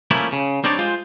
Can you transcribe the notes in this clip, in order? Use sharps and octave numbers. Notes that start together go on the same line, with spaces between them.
F3 A3 A#3 C#4 E4
C#3
G3 C4 D4 D#4 C#5 D5
G#3 F4 C5